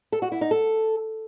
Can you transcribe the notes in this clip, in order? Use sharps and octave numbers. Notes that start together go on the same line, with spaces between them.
A4
F#4
E4
D#4
A4